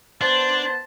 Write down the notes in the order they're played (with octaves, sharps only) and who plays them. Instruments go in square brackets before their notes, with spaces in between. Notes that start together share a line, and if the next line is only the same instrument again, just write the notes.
[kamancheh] B3 C5 [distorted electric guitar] D4 [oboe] A5